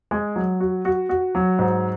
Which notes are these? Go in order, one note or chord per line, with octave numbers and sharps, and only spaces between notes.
G#3
F#3
F#4
F#4
F#4
F#3
G#2